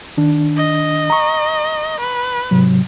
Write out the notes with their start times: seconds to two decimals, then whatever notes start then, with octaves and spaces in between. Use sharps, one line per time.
0.17 D#3 D4
0.56 D#5
1.10 A#5 C#6
2.01 B4
2.51 G#2 C3 F#3